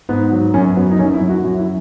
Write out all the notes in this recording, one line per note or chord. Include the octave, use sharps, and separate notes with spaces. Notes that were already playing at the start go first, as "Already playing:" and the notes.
G#2 B3
F#3
F#2 C#4
F#3 B3
D#4
F#2 C#4
E4
F#2
F#4
F#2 F#4
E4